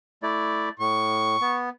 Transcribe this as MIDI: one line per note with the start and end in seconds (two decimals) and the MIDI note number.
0.23 0.69 57
0.23 0.69 64
0.23 0.69 74
0.80 1.36 45
0.80 1.56 85
1.41 1.69 59